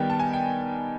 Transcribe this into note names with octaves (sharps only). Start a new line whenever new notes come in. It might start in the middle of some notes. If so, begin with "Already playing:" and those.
Already playing: D#3 G3 B3 G5
A5
G#5
G5